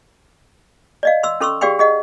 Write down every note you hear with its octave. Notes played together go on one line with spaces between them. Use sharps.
D5 D#5 F5
C6 E6
C#4 A4 C6 C#6 E6
G4 G#4 D5 F5 G5 C6
G#4 D#5 F#5